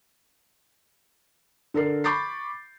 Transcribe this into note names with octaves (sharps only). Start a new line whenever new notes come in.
D3 A4 A#4 C7
B5 C#6 D6 G6 A6 C7